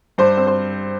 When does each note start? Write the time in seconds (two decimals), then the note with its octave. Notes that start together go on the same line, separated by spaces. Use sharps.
0.18 G2 C5
0.37 C4
0.47 C5